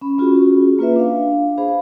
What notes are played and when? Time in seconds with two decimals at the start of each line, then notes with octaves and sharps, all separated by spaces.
0.01 C#4 B5
0.18 C#4 F4 F#4 G#4
0.79 A#3 F4 B4 E5
0.96 D4 F5
1.58 G#4 C5 F5 B5